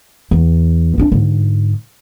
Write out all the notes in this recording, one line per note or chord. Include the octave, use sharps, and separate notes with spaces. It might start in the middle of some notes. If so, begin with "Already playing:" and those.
E2
C4 D4
G#2 D3